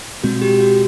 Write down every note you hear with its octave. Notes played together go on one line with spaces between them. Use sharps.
B2 G#3 C4 F#4
G4
F#4